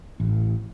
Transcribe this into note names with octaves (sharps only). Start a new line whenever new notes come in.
A1